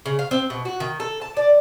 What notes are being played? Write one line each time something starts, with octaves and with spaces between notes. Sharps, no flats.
C#3
F5
C4
B2
F#4
D#3
A4
A5
D5